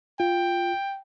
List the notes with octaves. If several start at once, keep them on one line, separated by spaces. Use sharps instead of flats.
F4 G5